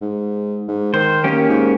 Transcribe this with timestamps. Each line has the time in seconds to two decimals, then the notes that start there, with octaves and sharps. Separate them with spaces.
0.01 G#2
0.68 G#2
0.94 D#3 C5
1.24 A#3 C#4 G4
1.49 G#2